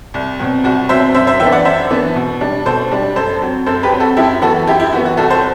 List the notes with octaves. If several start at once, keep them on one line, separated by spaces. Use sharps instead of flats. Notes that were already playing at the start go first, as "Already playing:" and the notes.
C2
B2 F#3 C4
C2 F#4
B2 F#3 C4 C5 E5
F#2 C5 E5
C5 E5
E3 B3 D4 E5 G5
D5 F#5
F#2 C5 E5
E3 B3 D4
B2
G3 D4
B2 A4 C5
G3 D4
F#2 A4 C5
F#3 C4
F#2 A4 C5
G4 B4
F#3 C4
F#4 A4
F#2 E4 G4
E3 B3 F#4 A4
F#2 E4 G4
E4 G4
E3 B3 F#4
F#4
C2 F#4 A4
A4 C5